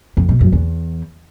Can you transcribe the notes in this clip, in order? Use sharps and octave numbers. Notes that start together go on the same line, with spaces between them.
F2
B2
F#2
E2